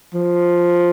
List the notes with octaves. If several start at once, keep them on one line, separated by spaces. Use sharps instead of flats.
F3